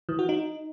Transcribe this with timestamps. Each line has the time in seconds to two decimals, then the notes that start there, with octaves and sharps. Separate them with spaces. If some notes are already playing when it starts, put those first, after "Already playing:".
0.09 E3
0.19 F#4
0.29 D#4